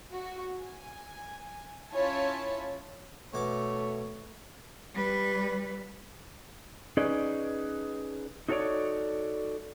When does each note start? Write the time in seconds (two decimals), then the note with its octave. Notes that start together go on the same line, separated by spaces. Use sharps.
0.12 F#4
0.57 G#5
1.91 C#4 E4 F4 C#5 G#5 A5
3.34 B2 A3 C#5 D6
4.94 G3 B4
6.97 C#4 D#4 G#4 B4 D5 D#5
8.48 D#4 F#4 A4 A#4 C#5 D5